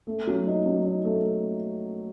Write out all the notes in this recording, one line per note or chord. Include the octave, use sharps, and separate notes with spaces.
A3
F#3
D#4
F#3
D#4
A3
A3